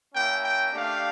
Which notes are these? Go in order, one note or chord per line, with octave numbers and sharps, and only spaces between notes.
A#3 C#4 E4 G5
G5
A3 D4 G4 F5